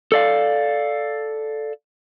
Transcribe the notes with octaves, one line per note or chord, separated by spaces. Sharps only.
A4 D5 F5